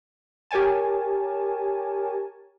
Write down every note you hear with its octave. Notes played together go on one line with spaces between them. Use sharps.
G4 A#4 C#5 G#5 A5